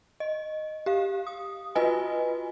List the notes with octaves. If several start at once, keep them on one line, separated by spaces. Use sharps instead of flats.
D#5
G4 F5
D#6
F4 F#4 B4 D#5 G#5